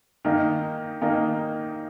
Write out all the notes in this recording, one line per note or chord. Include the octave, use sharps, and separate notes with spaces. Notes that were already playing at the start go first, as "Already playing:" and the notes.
D#3 A#3 D#4
D#3 A#3 D#4